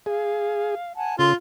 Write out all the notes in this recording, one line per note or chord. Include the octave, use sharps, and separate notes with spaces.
G#4 F5
F#5 G#5 A5
C#3 F4 A4 C6